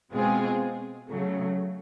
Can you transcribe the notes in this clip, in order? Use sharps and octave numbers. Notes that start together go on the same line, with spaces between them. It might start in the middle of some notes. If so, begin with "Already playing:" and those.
B2 G#3 C4 F4 G#4
C#3 F#3 A3